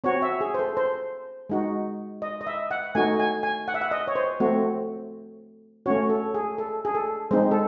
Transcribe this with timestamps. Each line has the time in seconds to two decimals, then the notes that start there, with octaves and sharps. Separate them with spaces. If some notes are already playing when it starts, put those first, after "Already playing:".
0.04 C4 F#4 C#5
0.22 E5
0.41 G#4
0.54 C5
0.59 A4
0.77 C5
1.50 G#3 D#4 F#4
2.22 D#5
2.41 D#5
2.47 E5
2.71 F#5
2.95 A3 D#4 F#4 G#5
3.19 G#5
3.43 G#5
3.68 F#5
3.74 E5
3.81 F#5
3.91 D#5
4.07 C#5
4.16 C5
4.40 A3 C4 F#4
5.86 A3 C#4 F#4 C#5
6.09 A4
6.34 G#4
6.58 A4
6.85 G#4
6.95 A4
7.31 G#3 C4 D#4 C5
7.51 A4